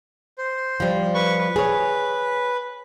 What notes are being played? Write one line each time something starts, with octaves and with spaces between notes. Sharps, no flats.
C5
F3 G3
B4 C#6
B4
G#4 C#5